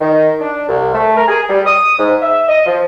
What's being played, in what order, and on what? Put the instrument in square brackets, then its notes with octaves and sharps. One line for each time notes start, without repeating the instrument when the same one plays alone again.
[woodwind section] D#3
D4
C2
A3
A#4
G#4
G3
D#6
G#2
E5
D#5
F3